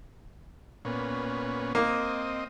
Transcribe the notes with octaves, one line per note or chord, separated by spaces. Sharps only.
A#2 B3 C#4
A#3 C4 D#5